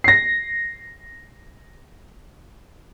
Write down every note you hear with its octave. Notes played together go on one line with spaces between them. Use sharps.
A#6 C7